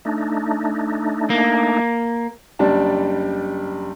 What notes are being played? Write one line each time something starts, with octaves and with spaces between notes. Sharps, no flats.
A3 D4 D#4
A#3
F#1 G3 D4 A5